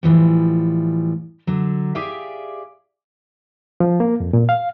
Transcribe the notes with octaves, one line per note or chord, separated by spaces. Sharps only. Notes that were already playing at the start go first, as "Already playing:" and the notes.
A2 E3 F3 G3
D3 F#3
G4 G#4 D5 E5 F5
F3
A#3
F2
A#2
F5